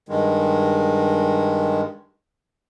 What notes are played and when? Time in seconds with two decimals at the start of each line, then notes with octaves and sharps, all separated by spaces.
0.09 G2 D#3 G#3